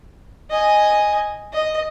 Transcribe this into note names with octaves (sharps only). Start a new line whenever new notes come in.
D#5 G#5
D#5